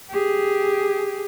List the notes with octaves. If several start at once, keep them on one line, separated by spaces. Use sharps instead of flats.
G4 G#4